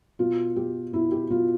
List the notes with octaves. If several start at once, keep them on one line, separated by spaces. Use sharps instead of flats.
B2 F4
B2 G4
B2 E4
G4
B2 F4